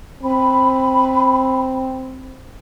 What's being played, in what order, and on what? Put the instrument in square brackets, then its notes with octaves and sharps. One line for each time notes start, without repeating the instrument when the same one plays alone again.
[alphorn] C4 [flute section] B5